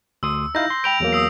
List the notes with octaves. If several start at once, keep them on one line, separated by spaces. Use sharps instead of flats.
D2 C6 D#6 E6
D#4 E4 F5 E6 G6 A#6
C6
G5 B5 G6 D7 F7
E2 F#3 A#3
D#6 E6 C7